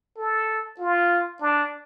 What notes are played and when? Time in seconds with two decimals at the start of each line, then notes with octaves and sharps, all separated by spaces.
0.17 A4
0.79 F4
1.41 D4